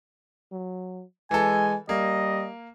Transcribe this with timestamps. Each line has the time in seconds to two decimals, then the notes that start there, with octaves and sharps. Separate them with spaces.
0.52 F#3
1.31 E3 G#3 A4 G#5
1.89 G3 A#3 D#5